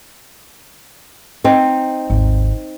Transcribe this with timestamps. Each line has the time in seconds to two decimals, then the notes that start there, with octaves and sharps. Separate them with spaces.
1.44 C4 D#4
2.10 G#1 D#2